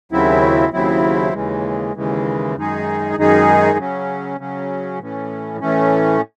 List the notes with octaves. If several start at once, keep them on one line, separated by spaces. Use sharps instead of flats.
D#2 C#3 F#3 C4 E4
D#2 C#3 F#3 C4 E4
D#2 C#3 E3 G#3
D#2 C#3 E3 G#3
F#2 D#3 G#3 D#4 G#4
F#2 D#3 G#3 D#4 G#4
C#3 F#3 C#4
C#3 F#3 C#4
A2 E3 A3 C#4
A2 E3 A3 C#4